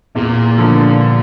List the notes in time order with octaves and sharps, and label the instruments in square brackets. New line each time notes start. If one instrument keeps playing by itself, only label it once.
[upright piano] E2 [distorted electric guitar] A#2
[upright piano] D3 F3 A#3